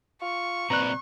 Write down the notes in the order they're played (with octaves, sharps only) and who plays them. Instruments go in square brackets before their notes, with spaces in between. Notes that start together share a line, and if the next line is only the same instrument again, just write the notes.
[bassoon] F4 [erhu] C#6
[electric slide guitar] A#2 C4 D5 [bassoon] B4 [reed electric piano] A#5 F#6